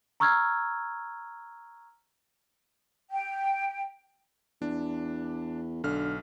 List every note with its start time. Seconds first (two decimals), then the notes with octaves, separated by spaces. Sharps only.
0.20 A#5 C#6 E6 F6 G#6
3.10 G5
4.62 E2 D4
5.84 B1 D3 F6